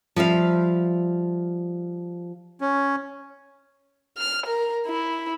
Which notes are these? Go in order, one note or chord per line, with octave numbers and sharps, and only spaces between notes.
F3 G3 E5 F5
C#4
F6
A#4
E4